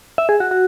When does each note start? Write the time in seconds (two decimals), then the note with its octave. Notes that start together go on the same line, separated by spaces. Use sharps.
0.18 E5
0.29 G#4
0.40 F#4
0.51 F#4